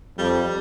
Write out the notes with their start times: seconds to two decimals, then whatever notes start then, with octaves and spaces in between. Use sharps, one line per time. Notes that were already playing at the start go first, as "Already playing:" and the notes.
0.18 F2 G3